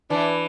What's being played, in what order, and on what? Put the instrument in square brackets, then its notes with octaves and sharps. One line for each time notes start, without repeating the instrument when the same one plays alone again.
[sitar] E3 [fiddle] D4